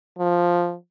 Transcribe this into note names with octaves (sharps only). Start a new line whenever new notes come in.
F3